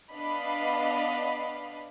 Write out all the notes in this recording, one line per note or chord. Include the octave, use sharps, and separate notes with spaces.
B3 D4 D5 D#5 F5 B5